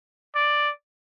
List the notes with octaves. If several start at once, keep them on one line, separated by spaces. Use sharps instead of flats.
D5